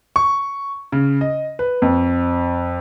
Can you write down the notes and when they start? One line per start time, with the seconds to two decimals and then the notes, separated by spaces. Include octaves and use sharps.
0.16 C#6
0.92 C#3
1.21 D#5
1.59 B4
1.82 F2